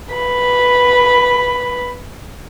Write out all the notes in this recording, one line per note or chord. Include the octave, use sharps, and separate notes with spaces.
B4 B5